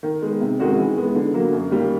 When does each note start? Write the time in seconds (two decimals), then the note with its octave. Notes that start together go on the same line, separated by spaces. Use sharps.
0.03 D#3
0.22 G#3 B3
0.41 C3
0.59 D#3 G#3 C#4 F#4
0.78 E3
0.97 G#3 B3
1.15 D3
1.34 F#3 A#3
1.52 F#2
1.70 D#3 G3 A#3